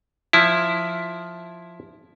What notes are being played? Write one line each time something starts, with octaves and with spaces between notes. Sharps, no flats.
F3 E4